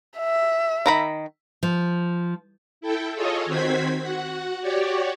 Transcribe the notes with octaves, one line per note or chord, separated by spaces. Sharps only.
E5
D#3 A#5 B5
F3
E4 A4 G5
F4 G#4 A4 C#5 D#5
D#3 C4 F#4 C5 G#6 B6
F#4 F#5
F#4 G4 C#5 D5